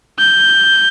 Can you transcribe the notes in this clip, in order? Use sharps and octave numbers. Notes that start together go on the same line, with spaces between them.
G6